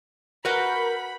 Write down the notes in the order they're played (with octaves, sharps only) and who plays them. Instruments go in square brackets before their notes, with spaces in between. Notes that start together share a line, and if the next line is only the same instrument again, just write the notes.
[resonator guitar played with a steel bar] F#4 B4 F#5 [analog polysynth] A#4 G6 [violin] B5